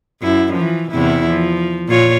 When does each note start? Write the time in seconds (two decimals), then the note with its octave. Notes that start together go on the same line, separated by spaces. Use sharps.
0.22 F#2 E4
0.53 E3 F3
0.91 E2 C3 E4
1.27 F3
1.88 A#2 F4 C#5